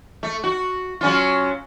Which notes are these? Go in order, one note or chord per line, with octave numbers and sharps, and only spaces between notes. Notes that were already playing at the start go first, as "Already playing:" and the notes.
A3
F#4
F#3 C#4 F4